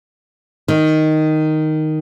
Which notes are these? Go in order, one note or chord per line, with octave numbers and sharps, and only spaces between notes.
D#3